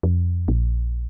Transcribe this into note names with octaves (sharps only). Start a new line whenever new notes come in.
F2
A#1